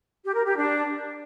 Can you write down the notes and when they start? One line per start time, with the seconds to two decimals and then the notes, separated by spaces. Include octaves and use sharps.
0.24 G4
0.35 A#4
0.45 G4
0.56 D4